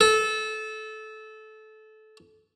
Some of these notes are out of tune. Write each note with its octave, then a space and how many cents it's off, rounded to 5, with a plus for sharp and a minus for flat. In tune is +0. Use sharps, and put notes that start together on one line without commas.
A4 -20